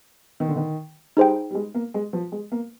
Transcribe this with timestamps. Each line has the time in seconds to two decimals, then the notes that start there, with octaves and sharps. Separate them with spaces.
0.40 D#3
0.48 D3
0.56 D#3
1.17 G3 D#4 G#4 C5 G5
1.50 G3
1.55 G#3
1.74 A#3
1.94 G#3
2.13 F3
2.32 G#3
2.52 A#3